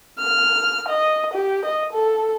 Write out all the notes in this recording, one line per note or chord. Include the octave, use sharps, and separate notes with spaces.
F6
D#5
G4
D#5
A4